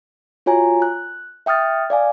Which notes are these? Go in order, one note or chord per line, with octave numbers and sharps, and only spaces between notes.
F4 F#4 C#5 G#5 A#5
F#6
E5 G5 D#6 F6 A6
D5 F5 G#5